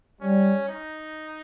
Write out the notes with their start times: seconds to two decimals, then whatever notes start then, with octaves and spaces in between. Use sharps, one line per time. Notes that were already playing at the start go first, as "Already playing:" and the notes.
0.22 G3 C#4
0.69 D#4